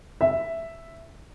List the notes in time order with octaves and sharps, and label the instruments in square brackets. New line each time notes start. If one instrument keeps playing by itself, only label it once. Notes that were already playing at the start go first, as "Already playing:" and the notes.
[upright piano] E5